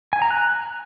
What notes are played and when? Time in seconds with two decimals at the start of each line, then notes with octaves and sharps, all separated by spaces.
0.13 G#5
0.22 A#5
0.31 F#6